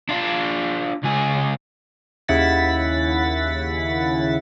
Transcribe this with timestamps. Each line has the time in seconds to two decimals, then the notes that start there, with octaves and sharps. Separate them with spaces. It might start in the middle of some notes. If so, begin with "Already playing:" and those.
0.09 D4 F4
1.04 C#2 G#4
2.28 D#2 C#3 E4 F#5 A6 B6